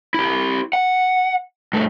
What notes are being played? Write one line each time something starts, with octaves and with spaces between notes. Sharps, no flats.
E4 G4
F#5
G2 A3